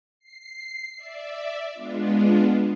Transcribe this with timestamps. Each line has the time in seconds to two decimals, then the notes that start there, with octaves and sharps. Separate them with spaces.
0.19 C7
0.96 D5 E5
1.73 G#3 B3 D4 F4